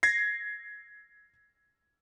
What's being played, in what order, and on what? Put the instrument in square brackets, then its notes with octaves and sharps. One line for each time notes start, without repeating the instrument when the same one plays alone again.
[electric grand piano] G#6 A#6 C7